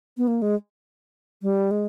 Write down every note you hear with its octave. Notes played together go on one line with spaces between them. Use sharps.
B3
A#3
G#3
G3
G#3